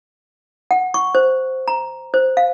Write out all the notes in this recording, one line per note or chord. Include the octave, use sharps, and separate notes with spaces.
F#5
C#6
C5
A#5
C5
F5